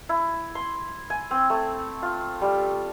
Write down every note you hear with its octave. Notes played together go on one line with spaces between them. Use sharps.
E4
C6
G#5
C4
A3
F4
G3